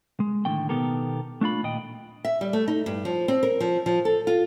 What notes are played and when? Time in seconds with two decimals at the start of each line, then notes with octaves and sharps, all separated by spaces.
0.20 G#3
0.45 A2 D3 D#3 A3 G5
0.69 B2 D#3 B3 G4 A4 A#4
1.41 A3 D4 F4 B5
1.63 D#2 A#2 D#5 G5
2.25 E5
2.41 G3
2.53 A3
2.68 D#4
2.86 G2
3.05 F3
3.28 C4
3.43 A#4
3.60 F3
3.86 F3
4.05 A4
4.27 F4